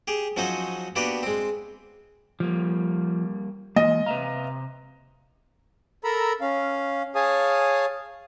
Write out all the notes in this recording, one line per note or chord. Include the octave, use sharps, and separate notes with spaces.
G4 G#4
F3 F#3 C#4 D#4 F#4 C5
A#3 B3 D4 F#4 G4 B4
G#3 C4
F3 G3 A#3
E3 G#3 A#3 D#5
C3 B4 E5 F5 A#5
A4 A#4 A#5 B5 E6
C#4 F5
G#4 C#5 F5 G#5 A5 D#6